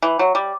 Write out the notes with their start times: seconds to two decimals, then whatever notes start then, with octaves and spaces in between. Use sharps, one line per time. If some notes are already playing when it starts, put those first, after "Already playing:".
0.03 E3
0.19 F#3
0.35 G3